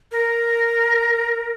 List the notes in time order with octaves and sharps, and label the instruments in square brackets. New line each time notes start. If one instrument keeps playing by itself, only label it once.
[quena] A#4